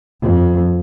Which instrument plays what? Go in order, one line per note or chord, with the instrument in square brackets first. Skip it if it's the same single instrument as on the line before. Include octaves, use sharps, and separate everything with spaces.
[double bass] F2